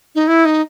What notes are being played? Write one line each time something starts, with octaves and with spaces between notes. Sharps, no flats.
D#4
E4
D#4